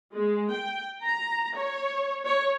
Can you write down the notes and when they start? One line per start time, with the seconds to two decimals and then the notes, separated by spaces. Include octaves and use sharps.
0.12 G#3
0.51 G5
1.02 A#5
1.55 C#5
2.25 C#5